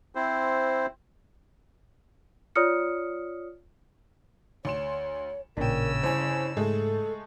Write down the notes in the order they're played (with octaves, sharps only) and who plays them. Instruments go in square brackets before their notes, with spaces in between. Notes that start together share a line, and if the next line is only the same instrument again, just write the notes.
[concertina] C4 E4 C5
[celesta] F4 C#5 D5 D#6 F6 C#7
[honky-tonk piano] D2 C6 E7 [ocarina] C#5
[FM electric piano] A1 A#2 [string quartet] C#3 E6 [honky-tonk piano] D4 G5 [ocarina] A#4
[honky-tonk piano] G1 C#5 [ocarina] E4 [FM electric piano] C5 G#5
[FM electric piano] G#2 [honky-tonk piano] G#3 A3 G#4 [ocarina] A4